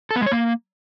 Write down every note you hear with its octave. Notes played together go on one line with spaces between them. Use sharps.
A4
B3
G#3
C#5
A#3